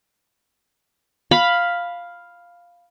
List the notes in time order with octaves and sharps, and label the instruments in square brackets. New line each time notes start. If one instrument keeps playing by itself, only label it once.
[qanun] F5 B5